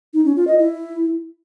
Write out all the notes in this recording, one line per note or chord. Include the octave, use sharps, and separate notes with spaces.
D#4
C#4
F4
D#5
E4